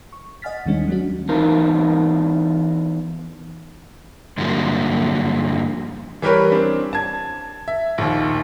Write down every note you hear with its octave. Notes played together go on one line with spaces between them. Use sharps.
C#6
D#5 F#5 G#5 F6 A6 B6
D#2 D#3 G3 G#3 C#4 D4
F#3 A3 C#4 D4 F#4
E3 B3 D#4 F4 A#4 C5
G2 D3 F3 F#3 A#3
E3 G3 G4 A#4 B4 C#5
C4 D4
A5 G#6
E5
A#1 D#2